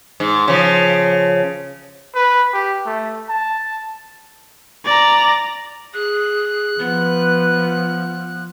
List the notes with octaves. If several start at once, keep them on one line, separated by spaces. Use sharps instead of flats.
G#2
C#3 F3
B4
G4
A3
A5
D5 A#5
G#4 F#6
F3 B3 B4